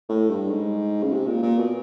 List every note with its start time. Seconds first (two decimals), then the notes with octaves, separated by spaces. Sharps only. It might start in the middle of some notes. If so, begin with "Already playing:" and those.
0.09 A2
0.30 G2
0.50 G#2
1.03 C#3
1.12 C3
1.27 A#2
1.43 A#2
1.58 B2